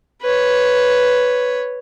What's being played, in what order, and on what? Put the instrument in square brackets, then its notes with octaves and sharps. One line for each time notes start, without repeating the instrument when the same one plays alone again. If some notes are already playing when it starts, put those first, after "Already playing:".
[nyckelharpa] B4 C#5